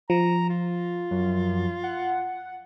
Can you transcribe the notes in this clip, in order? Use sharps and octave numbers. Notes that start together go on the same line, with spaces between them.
F3 A#5
F4
F#2
F#5